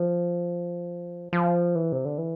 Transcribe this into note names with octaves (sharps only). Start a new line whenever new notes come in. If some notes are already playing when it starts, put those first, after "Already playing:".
Already playing: F3
F3
E3
C3
D3
E3